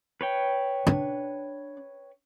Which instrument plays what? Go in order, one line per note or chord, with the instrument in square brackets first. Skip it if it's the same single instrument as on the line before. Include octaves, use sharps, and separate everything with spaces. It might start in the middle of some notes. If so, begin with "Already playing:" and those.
[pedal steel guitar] B4 C#5 G5
[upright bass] D4